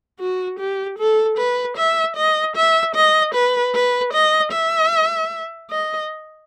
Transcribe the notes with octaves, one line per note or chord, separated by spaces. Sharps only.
F#4
G4
A4
B4
E5
D#5
E5
D#5
B4
B4
D#5
E5
D#5